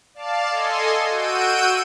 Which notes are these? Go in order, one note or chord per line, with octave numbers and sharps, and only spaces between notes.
D5 F5 A5
A4 D#5 G#5 C6
F#4 E6 G6 D7 D#7